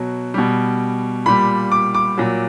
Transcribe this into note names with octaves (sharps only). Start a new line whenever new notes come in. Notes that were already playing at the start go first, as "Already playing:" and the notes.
Already playing: B2 F#3
B2 G3
A#2 G3 B5
D6
D6
A#2 F#3